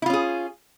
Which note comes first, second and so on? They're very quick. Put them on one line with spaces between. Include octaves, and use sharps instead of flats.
E4 F4 C#4 G#4